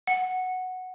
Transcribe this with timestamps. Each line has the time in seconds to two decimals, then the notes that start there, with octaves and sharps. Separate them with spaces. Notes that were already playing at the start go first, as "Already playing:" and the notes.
0.07 F#5